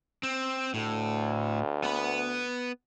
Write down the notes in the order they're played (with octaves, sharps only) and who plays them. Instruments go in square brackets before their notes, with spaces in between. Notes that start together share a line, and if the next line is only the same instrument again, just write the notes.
[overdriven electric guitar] C4
[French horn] D2 [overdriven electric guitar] A2
[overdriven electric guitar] B3 B5